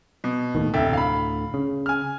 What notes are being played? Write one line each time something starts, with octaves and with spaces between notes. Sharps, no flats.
B2
D#2 A2 D#3
F1 D2 A2 D3 E5 G5
F5 B5
C#3
G#5 F6